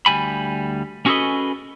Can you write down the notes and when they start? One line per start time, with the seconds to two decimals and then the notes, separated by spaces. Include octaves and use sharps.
0.06 D2 G3 G#5 B5
1.06 C#4 F#4 G#4 A4 B4 D#5